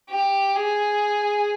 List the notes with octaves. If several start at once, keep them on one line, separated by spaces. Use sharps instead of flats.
G4
G#4